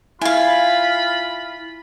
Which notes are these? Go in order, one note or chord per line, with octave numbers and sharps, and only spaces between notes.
E4 F4 F5 G#5 B5